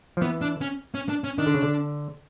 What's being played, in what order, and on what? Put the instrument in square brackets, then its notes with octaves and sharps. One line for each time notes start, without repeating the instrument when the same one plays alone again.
[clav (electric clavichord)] F3
[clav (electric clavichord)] E3 [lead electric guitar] B3
[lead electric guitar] D4
C#4
C#4
D4
C#4
[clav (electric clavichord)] D#3 [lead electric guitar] D4
[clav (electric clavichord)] D3
C#3
D3